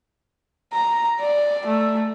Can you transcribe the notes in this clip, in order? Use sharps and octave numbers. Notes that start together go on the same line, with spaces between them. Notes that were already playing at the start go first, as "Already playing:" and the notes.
A#5
D5
A3